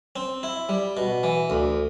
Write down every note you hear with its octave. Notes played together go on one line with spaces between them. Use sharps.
C4
E4
G3
B2
E3
D2